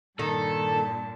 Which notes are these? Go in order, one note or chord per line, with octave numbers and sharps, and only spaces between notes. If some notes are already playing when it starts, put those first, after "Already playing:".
G2 A#2 D#3 D#4 A4 A5